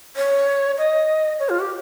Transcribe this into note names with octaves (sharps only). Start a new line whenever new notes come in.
C#5
D#5
C#5
F4
G4